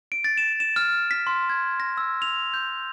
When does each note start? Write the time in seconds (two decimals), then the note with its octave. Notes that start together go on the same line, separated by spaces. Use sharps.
0.12 D7
0.24 A6
0.37 E7
0.60 E7
0.76 F6
1.11 B6
1.27 C6
1.49 G#6
1.80 A#6
1.97 E6
2.22 F7
2.54 G6